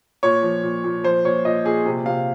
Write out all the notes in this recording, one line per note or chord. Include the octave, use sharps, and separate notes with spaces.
A#2 C#5
F3
A#2
A#2
F3 C5
A#2 C#5
A#2 D#5
A#2 G#4
C3
C3 F5